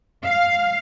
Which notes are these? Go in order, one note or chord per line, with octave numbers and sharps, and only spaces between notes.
F5